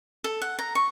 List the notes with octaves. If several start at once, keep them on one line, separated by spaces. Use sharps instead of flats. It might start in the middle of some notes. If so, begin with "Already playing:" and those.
A4
F#5
A#5
C#6